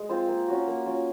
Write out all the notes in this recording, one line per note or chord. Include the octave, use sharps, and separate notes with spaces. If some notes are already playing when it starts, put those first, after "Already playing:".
Already playing: G#3
C4 F4 C5
A#3
C#4 F#4
A#3
C#4 F4